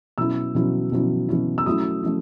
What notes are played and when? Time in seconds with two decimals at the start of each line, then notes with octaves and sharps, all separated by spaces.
0.18 B2 F#3 C#4 E4 E6
0.55 B2 F#3 C#4 E4
0.92 B2 F#3 C#4 E4
1.29 B2 F#3 C#4 E4
1.58 E6
1.66 F#3 A3 C#4 E4 D#6
2.03 A3 C#4 E4